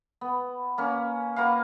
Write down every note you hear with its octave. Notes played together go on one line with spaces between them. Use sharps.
B3
A#3 C#4
A#3 F#4 B4 F5